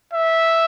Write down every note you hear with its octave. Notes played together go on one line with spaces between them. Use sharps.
E5